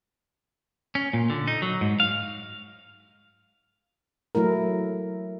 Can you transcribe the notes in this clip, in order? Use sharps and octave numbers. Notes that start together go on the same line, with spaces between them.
C#4
A#2
D3
D#4
F#3
G#2
F5
F#3 A3 E4 A#4